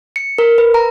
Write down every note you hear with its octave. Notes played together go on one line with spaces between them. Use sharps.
C#7
A#4
B4
A#5